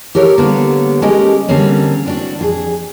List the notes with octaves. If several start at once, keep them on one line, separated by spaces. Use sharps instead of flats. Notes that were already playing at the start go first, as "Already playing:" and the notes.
G4 A4 A#4 C#5
D3 G3 A#3 B3 C#5
G#3 C#4 G4 A4 A#4 D#5
D3 G3 A#3 C4 C#4
C4 D4 F#4
F2 F4 G#4